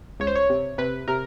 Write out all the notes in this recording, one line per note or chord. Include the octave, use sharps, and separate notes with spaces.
C#2 C#5
C5
C#5
C3
C3 B4
C3 A#4